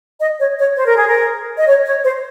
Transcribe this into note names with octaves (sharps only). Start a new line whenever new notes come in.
D#5
C#5
C#5
C5
A#4
G#4
A#4
D#5
C#5
C#5
C5